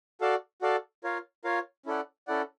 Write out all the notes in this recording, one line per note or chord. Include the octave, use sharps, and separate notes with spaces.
F#4 A4 D5 F5 A5
F#4 A4 D5 F5 A5
F4 A#4 C#5 F5
F4 A#4 C#5 F5
C#4 E4 A4 D5 F#5
C#4 E4 A4 D5 F#5